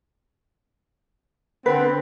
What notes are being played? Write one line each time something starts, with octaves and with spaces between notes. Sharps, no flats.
D3 B3 C4 B4